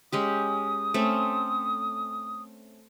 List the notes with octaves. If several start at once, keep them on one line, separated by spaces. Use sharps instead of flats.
G#3 C#4 G4 D#6
A3 C4 C#4